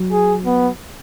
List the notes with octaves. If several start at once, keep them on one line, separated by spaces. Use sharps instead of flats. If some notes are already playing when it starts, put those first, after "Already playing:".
Already playing: F#3
G#4
B3